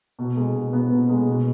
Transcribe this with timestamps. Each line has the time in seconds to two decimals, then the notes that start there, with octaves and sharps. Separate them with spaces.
0.19 B2
0.36 G#3
0.55 B2
0.73 B3
0.91 B2
1.09 G#3
1.27 B2